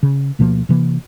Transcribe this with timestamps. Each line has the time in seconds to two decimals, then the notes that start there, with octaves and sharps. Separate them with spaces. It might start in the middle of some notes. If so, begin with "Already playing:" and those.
0.03 C#3
0.39 D2 B2 F3 A#3
0.69 C3 E3 A#3